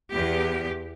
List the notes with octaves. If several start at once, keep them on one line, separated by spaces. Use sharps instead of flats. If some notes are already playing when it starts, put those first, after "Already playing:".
E2 G4